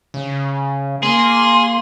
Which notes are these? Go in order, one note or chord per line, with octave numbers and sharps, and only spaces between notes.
C#3
A#3 G#4 C6